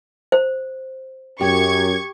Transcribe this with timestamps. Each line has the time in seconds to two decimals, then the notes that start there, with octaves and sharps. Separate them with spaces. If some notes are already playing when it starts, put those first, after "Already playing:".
0.32 C5
1.41 F#2 G4 C#6 G#6